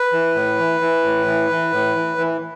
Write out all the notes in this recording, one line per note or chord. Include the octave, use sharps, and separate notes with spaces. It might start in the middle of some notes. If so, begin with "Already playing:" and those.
Already playing: B4
E3
A2
E3
E3
A2
E3
E3
A2
E3
E3